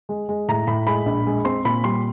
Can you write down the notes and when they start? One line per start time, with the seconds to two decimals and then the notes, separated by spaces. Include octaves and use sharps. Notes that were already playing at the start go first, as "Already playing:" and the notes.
0.09 G#3
0.29 G#3
0.48 A2 A#5
0.67 A2 B5
0.87 G#3 B5
1.06 A#1
1.26 G#3
1.45 C4 C6
1.65 A#2 B5
1.84 G3 C6